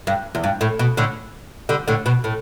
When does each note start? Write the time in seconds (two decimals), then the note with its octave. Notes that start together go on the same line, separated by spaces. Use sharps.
0.07 G2
0.35 E2
0.44 G2
0.61 A2
0.79 B2
0.97 A2 D3
1.69 D3 G3
1.88 A2 D3
2.06 B2
2.24 A2